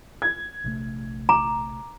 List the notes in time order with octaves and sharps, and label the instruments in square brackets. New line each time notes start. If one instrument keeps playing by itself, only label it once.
[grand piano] G#6
[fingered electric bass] A#1 C3 A3
[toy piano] A#5 [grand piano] D6